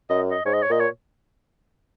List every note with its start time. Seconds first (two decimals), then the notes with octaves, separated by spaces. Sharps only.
0.10 F#2 D#5
0.31 D#5
0.45 G#2 C#5
0.53 D#5
0.63 C#5
0.70 A#2 D#5
0.80 C#5